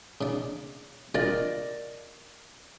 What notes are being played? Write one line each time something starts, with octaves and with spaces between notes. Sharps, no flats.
C#3 D4
D4 F4 A#4 D5 D#5